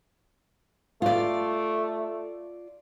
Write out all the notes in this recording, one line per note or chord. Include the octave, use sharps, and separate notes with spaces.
A3 F4 D5